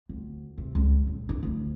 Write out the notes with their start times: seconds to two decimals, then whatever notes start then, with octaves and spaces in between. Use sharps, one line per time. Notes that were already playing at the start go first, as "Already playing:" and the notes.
0.09 D2
0.58 C3
0.75 C#2
1.07 D#1
1.29 D4
1.43 D2